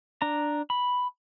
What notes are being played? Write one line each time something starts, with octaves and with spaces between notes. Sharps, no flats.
D4 A#5
B5